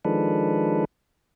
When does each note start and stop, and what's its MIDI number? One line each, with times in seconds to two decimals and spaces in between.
0.05 0.85 51
0.05 0.85 53
0.05 0.85 56
0.05 0.85 62
0.05 0.85 69
0.05 0.85 71